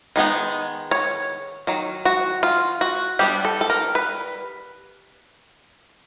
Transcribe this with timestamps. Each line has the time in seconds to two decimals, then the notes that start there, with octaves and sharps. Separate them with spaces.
0.16 D#3 G#3 B3 D#4
0.91 C#5
1.67 D#3 F#3
2.05 F#4
2.43 F4
2.81 F#4
3.19 G3 B3 D4 G4
3.45 A4
3.61 A4
3.70 A#4
3.95 B4